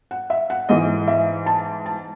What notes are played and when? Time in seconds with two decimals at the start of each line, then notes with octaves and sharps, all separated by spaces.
0.11 F#5
0.30 E5
0.50 F#5
0.69 G#2 E3 D#5
1.08 E5
1.46 A5
1.86 A5